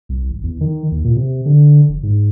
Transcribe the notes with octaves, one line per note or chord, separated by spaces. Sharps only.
C2
G#1
E2
D#3
D#2
A#2
C3
D3
F1
G#2